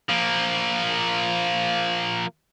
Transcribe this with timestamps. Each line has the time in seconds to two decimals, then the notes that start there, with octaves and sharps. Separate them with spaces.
0.09 F3 A#3